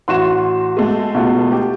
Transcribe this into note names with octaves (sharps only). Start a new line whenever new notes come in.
A1 F#4 C6 E7
G#3 A3
C#2 B2
G4